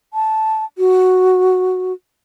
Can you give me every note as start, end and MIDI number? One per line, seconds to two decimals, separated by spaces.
0.14 0.65 81
0.78 1.93 66